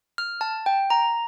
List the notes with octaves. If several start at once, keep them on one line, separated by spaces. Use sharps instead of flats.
F6
A5
G5
A#5